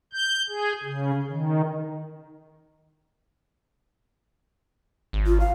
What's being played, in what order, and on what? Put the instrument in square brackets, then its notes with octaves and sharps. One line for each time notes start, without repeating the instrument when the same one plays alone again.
[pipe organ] G6
G#4
C#3
D#3
[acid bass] G#1
[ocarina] F4
F5